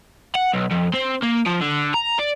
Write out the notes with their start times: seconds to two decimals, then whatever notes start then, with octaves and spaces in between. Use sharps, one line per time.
0.35 F#5
0.53 B1
0.71 F2
0.93 C4
1.22 A#3
1.46 F3
1.61 D3
1.94 A#5
2.19 D5